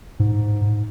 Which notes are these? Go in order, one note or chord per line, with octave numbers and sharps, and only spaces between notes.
G#2